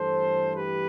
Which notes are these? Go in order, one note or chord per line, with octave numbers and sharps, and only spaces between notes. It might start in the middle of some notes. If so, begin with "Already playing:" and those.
Already playing: G2 E3 A3 A4 C5
G4 B4